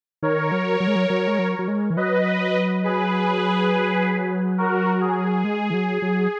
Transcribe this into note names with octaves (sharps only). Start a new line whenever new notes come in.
D#3 A#4 C#5
F#3
F#3
G#3
F#3
F#3
G#3
F#3
F#3
G#3
E3
F#3 B4 D#5
G#4 B4
F#4 A#4
G#4
G#3
E3
F#3
F#3